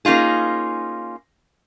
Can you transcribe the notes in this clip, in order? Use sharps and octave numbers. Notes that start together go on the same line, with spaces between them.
A#3 C#4 D#4 F4 G#4